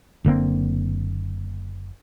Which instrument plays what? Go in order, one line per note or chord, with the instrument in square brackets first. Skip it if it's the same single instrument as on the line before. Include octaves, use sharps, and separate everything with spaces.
[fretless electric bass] F#1 D3 A#3 C4